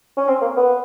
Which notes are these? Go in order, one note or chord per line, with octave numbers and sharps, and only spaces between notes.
C#4
C4
A#3
B3